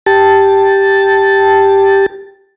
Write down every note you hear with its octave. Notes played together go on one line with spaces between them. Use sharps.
G4 A5